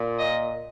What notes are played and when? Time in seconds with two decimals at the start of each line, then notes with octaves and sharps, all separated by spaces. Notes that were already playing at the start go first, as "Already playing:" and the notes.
Already playing: A#2
0.19 D#5